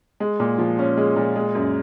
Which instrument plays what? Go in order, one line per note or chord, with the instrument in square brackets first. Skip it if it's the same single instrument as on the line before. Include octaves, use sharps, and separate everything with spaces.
[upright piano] G#3
A#2
F3
C#4
G#3
A#2
G#3
F#2